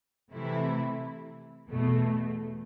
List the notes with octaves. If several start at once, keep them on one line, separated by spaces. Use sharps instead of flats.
C3 E3 A3 E4
E2 B2 A3